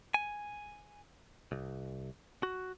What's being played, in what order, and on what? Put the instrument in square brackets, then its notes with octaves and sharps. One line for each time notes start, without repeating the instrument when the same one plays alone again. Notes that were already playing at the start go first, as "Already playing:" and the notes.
[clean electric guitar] G#5
C2
F#4